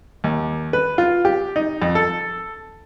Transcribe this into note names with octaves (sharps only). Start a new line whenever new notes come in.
D#2
B4
F4
G4
D#4
F2
A4